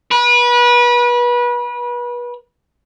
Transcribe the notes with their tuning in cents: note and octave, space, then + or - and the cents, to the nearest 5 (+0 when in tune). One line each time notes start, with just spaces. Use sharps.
B4 -30